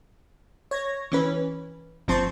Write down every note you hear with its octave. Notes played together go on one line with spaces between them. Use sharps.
C#5 G#6 A#6
E3 C#4 B4
G1 F3 C4 A5 C6 C#6